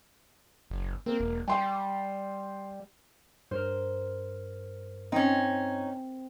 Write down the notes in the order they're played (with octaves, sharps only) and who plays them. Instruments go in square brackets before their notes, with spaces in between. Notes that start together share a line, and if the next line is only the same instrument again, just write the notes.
[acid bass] F#1
[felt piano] A#3 [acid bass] C4
[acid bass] E1
[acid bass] G3 [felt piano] G5 C6
[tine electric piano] G2 [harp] A#4 C5
[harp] C4 [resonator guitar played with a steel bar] C#4 D#4